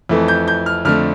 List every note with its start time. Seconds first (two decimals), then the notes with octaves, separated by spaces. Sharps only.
0.09 F2 E3 A3
0.28 G6
0.48 G6
0.66 F6
0.85 F2 D3 A3 F6